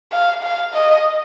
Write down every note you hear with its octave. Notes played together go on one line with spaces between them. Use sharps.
F5
F5
D#5